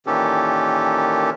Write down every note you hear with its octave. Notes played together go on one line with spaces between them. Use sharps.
A#2 D#3 E3 C#4 G4 A4